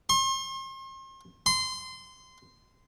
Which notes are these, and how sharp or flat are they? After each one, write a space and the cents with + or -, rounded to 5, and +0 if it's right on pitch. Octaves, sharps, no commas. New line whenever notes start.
C6 +40
C6 -20